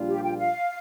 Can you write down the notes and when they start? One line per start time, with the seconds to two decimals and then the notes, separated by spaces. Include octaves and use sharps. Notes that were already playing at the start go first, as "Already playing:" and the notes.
Already playing: A#1 A#2 G3 D4 F4
0.09 G4
0.23 G5
0.38 F5